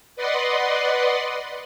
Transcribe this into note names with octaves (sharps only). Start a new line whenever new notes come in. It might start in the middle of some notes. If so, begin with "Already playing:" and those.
B4 D5 D#5 F#5 C6